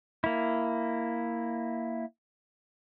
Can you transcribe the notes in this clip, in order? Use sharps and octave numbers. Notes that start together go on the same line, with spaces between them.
A#3 E4